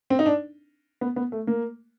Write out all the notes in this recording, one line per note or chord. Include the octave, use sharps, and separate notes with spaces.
C4
D#4
D4
B3
B3
A3
A#3